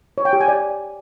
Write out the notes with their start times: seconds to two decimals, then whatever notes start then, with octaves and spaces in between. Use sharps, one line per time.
0.18 C#5
0.25 G5
0.33 G4
0.41 G#5
0.48 D5